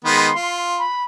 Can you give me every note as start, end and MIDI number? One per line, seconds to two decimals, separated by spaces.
0.05 0.30 51
0.05 0.30 56
0.05 0.30 59
0.05 0.55 84
0.35 0.83 65
0.78 1.03 83